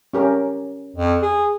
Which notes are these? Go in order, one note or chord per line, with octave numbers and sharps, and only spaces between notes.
C#4 G4 A#4
F2
G#4